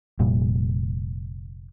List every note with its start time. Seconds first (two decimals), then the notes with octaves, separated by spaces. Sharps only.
0.19 F1 A#2 G3